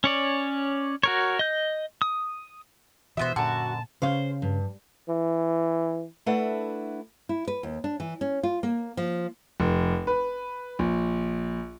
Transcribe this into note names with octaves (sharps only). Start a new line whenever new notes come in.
C#4 C#5 D5
F#4 A#4 C#5
D#5 G6
D#6
B2 E3 B3 F#4 C5 D#5 E5
F#2 A#2 D3 F#4 A5
C#3 C#4 C5 F5
G2
E3
A3 D4 E4 A4 B4 F#5
E4
B4
D#2
D4
E3
C#4
F4
A#3
F3
F1
B4
A#1